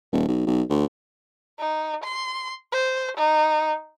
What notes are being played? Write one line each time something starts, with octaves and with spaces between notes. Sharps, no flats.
D#1
B1
B1
D2
D#4
C6
C5
D#4